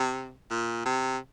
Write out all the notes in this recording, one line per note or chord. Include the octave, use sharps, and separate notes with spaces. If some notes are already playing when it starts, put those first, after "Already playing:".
Already playing: C3
A#2
C3